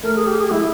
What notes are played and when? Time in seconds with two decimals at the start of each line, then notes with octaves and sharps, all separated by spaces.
0.03 A3 A#4
0.16 G#4
0.27 G4
0.39 G#4
0.51 G#3 E4